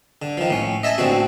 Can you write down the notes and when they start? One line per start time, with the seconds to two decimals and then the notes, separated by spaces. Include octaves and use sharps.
0.22 D3
0.37 D#3 F3
0.50 A2 C#4
0.83 D#5 E5 G#5 A5
0.98 A1 D3 C4 F#4